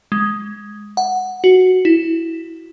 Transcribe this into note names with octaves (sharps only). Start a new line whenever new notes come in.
G#3
F#5
F#4
E4